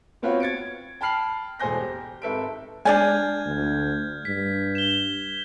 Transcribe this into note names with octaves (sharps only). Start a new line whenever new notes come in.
B3 C4 F4 F#4 B4 C#5
G#6 A6 C#7 D7
G5 A5 B5 F6 C7 F#7
E1 A4 C5 G#5 G6 A#6
G4
G#1 A4 B4 E5 A5 D7
G#3 D4 D5 G#5 F6 G6 G#6
D2
G2 B6
E7 G7